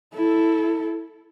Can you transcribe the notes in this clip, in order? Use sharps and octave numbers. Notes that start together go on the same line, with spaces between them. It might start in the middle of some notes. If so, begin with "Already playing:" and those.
E4 A4